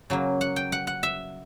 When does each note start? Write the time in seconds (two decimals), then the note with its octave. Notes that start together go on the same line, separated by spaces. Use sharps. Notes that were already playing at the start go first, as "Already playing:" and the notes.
0.10 C#3 F#3 A#3
0.41 F#5
0.56 G5
0.72 F#5
0.87 F#5
1.03 E5